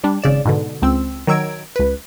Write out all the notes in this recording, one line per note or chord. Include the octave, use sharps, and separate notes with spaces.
G3 D4
G#1 C#3 D5 E7
G#2 B2 D3
C#2 C4 E6
D#3 F#3 A#5 E6 G#6 D7
C#2 B4